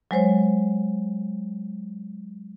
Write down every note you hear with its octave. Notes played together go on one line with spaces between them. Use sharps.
F#3 G#3 C5 C#5